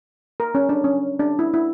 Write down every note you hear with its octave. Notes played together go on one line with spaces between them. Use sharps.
A#4
C#4
D4
C#4
D4
E4
E4